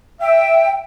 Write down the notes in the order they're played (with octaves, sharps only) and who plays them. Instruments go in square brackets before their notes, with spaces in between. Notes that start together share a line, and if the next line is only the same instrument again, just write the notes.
[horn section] E5 [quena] G5